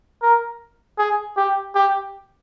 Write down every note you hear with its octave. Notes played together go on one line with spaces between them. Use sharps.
A#4
G#4
G4
G4